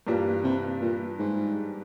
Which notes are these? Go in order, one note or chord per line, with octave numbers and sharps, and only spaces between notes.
G2 A#2 E3 G3 A#3
C3
A#2
G#2